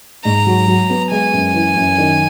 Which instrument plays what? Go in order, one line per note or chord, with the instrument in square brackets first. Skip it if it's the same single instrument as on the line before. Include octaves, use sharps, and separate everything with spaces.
[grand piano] G#2 [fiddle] A#5
[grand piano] F#3
F#3
B3
[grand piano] G#3 [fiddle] G#5
[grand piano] F#2
E3
F#2
D#3